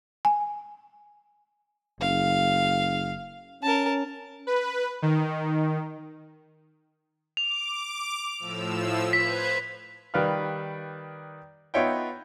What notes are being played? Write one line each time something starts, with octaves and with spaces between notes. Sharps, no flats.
G#5
F#1 F5
C#4 A#4 A5
B4
D#3
D6 F7
A2 F3 E6
B4 C5 G#6 B6
D#3 G3 B4 D5 F5 F6
B3 D#4 F4 C#5 E5 G5